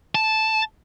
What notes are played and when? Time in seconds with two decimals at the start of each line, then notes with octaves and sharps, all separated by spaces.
0.15 A5